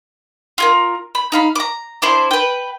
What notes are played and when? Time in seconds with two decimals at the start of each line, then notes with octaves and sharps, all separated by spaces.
0.58 F4 G#4 A#4
1.15 B5
1.32 D#4 F5 B5
1.55 A#5 D6
2.02 D4 E4 C5
2.31 B4 G5